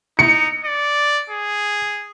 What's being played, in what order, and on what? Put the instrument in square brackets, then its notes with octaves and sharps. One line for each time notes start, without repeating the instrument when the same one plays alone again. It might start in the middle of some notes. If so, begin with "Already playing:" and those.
[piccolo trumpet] D#4 [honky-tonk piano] C#7
[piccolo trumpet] D5
G#4